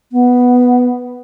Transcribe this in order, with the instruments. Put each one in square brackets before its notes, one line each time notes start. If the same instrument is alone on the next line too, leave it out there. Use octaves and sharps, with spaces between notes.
[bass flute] B3